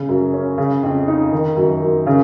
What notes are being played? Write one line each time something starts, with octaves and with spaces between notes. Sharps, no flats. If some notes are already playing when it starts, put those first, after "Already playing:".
Already playing: C#3 C#4
F#2
C#4
C#3
F2
D#4
D#3
F#2
F#2
C#3